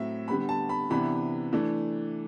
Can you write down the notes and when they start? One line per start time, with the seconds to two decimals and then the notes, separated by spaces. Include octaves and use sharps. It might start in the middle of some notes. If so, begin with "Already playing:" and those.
Already playing: A2 F#3 C4 E5
0.28 D3 G3 B3 B5
0.49 A5
0.69 B5
0.90 C3 E3 B3 D4 B5
1.53 E3 A3 D4